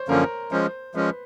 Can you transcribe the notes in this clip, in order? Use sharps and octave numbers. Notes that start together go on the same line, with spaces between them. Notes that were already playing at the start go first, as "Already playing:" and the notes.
Already playing: C5 C#5
F#2 D3 F3 A#3 C#4 A#4
F3 G#3 C#4 C5
F3 G#3 C#4 B4